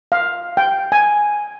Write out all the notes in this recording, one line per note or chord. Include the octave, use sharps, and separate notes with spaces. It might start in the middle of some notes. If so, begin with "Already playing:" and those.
F5
G5
G#5